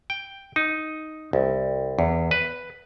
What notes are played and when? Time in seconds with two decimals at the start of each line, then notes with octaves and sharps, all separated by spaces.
0.10 G5
0.56 D#4
1.33 C2
1.99 E2
2.31 B4